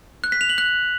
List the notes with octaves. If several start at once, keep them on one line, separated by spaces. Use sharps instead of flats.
F#6
B6
F7
F#7
F#6